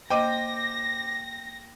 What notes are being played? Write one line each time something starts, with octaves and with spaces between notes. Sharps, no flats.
A#3 C5 D#5 G5 D6 A#6 D#7